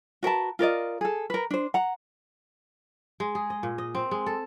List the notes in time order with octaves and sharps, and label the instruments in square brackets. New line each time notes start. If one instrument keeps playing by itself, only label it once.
[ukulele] F#4 A#4 B4 A5
F4 A#4 D5 D#5
G#4 A4
A#4 B4
D4 C5
F#5 A#5
[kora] G#3
G#4
D#5
A#2
D#5
C4
G#3
A4